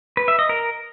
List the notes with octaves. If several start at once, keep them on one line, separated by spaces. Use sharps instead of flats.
B4
E5
D#5
A#4